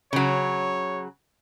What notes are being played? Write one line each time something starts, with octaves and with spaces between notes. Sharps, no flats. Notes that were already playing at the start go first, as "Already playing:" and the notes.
C#3 F#3 C#5